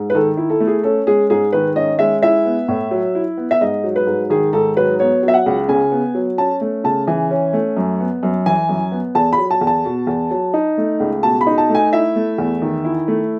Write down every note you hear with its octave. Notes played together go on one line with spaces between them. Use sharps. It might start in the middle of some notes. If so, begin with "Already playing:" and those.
Already playing: G#2
B4
D#3 A4
E4
A4
A3
G#4
C#4 A4
G#3 G#4
G#2 G#4
D#3 B4
C#4 D#5
G#3 E5
E4 E5
B3
A2
F#3
E4
B3
E5
G#2 D#5
F#3
B4
G#2
D#3 G#4
G#2 A4
F#3 B4
B3 C#5
F#3
E5
F#5
C#2
C#3 G#5
B3
F#3
C#4 A5
A3
C#3 A5
E3 G#5
C#4
A3
F#2
B3
F#2
E3 G#5
F#2
B3
E2 A5
B5
F#3
A5
E2
A5
B2
E2
F#3
D#4
A3
C#2
B2 A5
B5
D#4
A5
A3
G#5
E4 E5
A3
E2
D#3
E4
A3